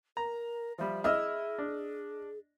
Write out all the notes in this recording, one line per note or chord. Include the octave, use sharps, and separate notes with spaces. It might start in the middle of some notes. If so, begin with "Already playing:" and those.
A#4 A#5
F3 G3 E5
E4 G#4 D#5 E6 F6
D4